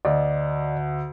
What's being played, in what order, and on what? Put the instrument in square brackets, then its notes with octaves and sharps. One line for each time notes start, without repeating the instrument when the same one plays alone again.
[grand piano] D2 [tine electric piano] D5 D#5